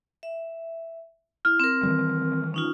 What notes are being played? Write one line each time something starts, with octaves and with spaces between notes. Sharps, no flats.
E5
E4 F6
C4 A#4
D#3 E3 G3
C#4 D#4 F4